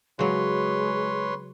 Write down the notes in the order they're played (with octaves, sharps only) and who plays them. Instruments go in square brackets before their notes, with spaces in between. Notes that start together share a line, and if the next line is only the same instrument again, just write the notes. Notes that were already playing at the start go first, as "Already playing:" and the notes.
[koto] C#3 F#3 [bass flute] G#3 [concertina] B4 C#5 C6